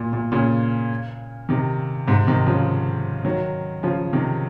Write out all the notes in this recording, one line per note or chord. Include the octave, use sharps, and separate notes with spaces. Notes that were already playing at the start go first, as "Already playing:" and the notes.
Already playing: A#2
A#2
A#2 C#3
C3 D#3
G#2 C3
C3 D#3
C#3 F3
D#3 F#3
C#3 F3
C3 D#3